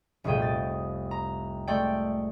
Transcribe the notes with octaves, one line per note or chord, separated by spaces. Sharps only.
F1 C2 A#2 G#4 G5 D#7
A6
A#5
G#3 A3 D5 G5